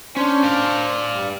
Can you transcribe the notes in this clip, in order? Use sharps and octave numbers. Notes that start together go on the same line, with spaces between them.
C#4 D4 C5
D5 F5
G2 G3